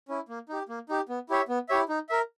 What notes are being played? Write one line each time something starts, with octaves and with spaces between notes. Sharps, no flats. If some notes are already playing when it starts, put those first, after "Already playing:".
C#4 E4
A#3
D#4 G4
A#3
D#4 G4
B3
E4 G4 C#5 E5
B3
E4 G4 C#5 E5
D#4
A#4 E5